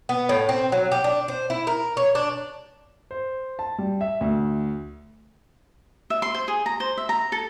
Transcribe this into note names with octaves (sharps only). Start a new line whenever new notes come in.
B3
A2
C4
F#3
G4
D4
C5
E4
A#4
C#5
D4
C5
A5
G3
E5
D2
E5
C6
C5
G#4
A#5
C5
E5
A#5
A4